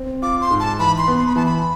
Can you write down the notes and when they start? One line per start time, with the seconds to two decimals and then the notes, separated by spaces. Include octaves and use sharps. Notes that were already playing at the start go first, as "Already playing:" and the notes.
Already playing: C4
0.22 F4 D6
0.41 C6
0.51 G#2
0.60 A5
0.79 E3 B5
0.98 C6
1.08 B3
1.17 C6
1.27 B5
1.36 E3 A5
1.46 B5